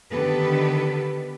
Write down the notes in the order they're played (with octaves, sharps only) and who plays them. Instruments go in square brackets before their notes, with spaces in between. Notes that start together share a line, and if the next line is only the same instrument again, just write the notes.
[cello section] D3 D#3 B3 G4 A4 B4